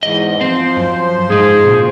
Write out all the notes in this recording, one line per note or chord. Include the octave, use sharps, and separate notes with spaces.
E2 G#2 D#5
F3 C4 C5
F#2
G#2 D#4 G#4
A#2 C#3